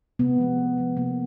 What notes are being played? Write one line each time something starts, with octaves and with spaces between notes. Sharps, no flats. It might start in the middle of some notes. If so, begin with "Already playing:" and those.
C3 B3
F3 G#3
C3
F3 G#3
C3 A#3